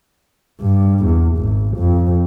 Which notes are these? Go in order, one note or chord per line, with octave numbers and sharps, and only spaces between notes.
G2
E2
G#1
F2